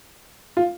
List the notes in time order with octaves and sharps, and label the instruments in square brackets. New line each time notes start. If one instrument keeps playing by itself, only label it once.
[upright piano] F4